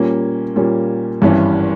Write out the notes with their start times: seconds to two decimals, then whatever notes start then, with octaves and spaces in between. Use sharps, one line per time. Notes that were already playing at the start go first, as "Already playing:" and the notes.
Already playing: A#2 G3 A#3 C#4
0.56 A#2 G3 A#3 C#4
1.22 G#1 G2 E3 G3 C#4